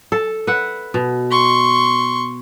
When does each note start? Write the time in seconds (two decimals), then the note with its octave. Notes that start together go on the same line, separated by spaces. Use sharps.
0.12 A4
0.47 B4 E5 F#5
0.94 B2
1.31 C6 C#6